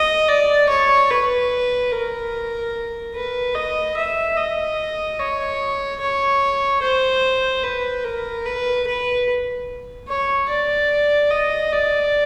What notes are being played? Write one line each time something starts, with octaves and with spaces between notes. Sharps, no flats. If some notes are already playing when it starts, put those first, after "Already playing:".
Already playing: D#5
D5
C#5
B4
A#4
B4
D#5
E5
D#5
C#5
C#5
C5
B4
A#4
B4
B4
C#5
D5
D#5
D5